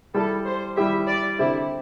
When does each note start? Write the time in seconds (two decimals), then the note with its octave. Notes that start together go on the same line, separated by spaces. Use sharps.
0.14 G3 E4 G4 A4
0.46 C5
0.77 G3 E4 G4 E5
1.08 D5
1.39 D3 C4 E4 G4